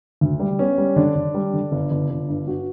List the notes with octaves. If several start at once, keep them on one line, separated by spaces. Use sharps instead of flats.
D2
G3
B3 C#4
G3
D3 D4
D3
G3
D3
G1
G1
G1
G2
G2 F#4